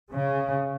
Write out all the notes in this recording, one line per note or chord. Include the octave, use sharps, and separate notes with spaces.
C#3